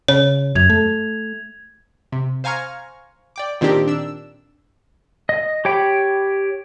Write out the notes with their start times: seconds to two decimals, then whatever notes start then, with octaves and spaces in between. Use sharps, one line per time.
0.08 C#3 C#5
0.55 F#2 G#6 F7
0.70 A3
2.12 C3
2.44 C5 F5 G#5 A#5 C#6 F6
3.36 D5 G5 D6
3.61 A#2 D#3 C4 D4 G4 A#4
3.88 D4 E6
5.29 D#5
5.65 G4 C#5 G5 B5